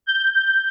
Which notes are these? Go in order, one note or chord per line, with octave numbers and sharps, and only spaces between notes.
G6